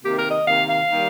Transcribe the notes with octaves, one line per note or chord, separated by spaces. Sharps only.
C3 D#3 A#3 G4
A#4
D#5
C3 D#3 A#3 F5
F5
D#3 G3 A#3